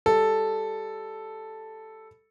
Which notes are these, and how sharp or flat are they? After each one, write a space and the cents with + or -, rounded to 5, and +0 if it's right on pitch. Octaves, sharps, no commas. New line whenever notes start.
G3 +10 A4 +0